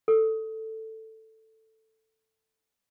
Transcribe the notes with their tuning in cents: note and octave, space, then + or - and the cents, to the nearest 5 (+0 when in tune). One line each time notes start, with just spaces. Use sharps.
A4 +5